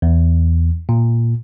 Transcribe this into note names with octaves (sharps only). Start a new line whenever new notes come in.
E2
A#2